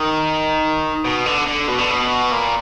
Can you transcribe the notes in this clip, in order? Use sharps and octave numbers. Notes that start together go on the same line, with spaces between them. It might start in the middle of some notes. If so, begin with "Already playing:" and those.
Already playing: D#3
B2
D3
D3
B2
D3
B2
A#2